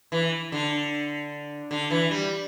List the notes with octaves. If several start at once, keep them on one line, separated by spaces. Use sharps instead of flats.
E3
D3
D3
E3
G3